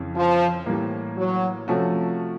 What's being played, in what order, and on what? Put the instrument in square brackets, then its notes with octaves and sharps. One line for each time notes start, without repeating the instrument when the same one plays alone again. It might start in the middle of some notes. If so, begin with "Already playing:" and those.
Already playing: [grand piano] F2 C#3 E3
[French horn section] F3
[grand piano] A2 E3 G3 A#3
[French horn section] F#3
[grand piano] C3 F3 A3 C#4 F#4